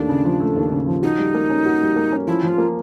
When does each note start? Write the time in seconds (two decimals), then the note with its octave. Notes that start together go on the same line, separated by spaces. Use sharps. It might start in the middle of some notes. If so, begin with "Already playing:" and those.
Already playing: D#2 A3 D4
0.09 C#3
0.25 F3
0.40 A3
0.56 D#2
0.72 C#3
0.87 F3
1.02 D#4 F#4
1.18 G3
1.34 A#3
1.50 C#4
1.65 F#4
1.81 G3
1.96 A#3
2.12 C#4
2.27 F3 E4
2.43 F3 F4
2.58 A#3